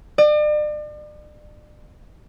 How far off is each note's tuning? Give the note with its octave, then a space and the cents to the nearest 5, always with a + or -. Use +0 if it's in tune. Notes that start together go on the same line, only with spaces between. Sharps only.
D5 +40